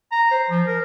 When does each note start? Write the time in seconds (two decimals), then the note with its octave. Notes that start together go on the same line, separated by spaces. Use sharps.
0.12 A#5
0.31 C5
0.50 F3
0.67 A#4